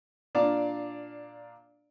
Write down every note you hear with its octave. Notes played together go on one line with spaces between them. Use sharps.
A#2 D4 D5 F5 A#5 D6